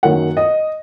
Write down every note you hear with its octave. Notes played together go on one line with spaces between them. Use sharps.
F#2 D#3 F#3 A#3 F#5
D#5